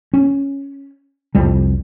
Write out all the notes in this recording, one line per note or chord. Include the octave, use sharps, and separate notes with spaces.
C#4
C2 F2 G3